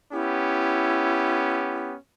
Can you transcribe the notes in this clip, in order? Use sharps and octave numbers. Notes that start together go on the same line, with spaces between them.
B3 C#4 E4 G4